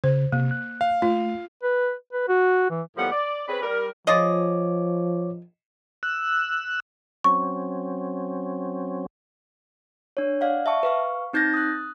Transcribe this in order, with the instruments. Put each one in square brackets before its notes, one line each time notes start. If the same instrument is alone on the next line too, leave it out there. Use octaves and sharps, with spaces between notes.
[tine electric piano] C#3 [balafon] C5
[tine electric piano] C3 [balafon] A#3
[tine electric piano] F#6
[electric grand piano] F5
[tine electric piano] A3 [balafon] F4
[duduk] B4
B4
F#4
E3
[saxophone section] A2 F3 G3 A#3 B3 F#5
D5
C4 C#4 G#4 B4
G3 A#4
[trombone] F3 [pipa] F4 G#4 D#5 [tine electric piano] C#5 D6
[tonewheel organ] E6 F#6
[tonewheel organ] F#3 C4 C#4 [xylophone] C#6
[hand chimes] D4 C#5
D5 F5 F#5
E5 A5 C#6
B4 F5 C#6
C4 D#4 G6 A6 A#6
D#6 F#6